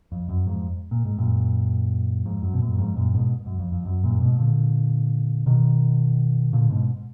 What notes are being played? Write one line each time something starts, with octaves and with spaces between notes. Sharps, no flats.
F2
F#2
F2 G#2
A#2
G#2
F#2 A#2
F2 G#2
F#2
B2
F#2 A#2
A#2
F2 G#2
F#2 A#2
G#2 B2
F#2
F2
F2
F#2
F#2 A#2
G#2 B2
A#2 D3
B2 D#3
A#2 D3
G#2 B2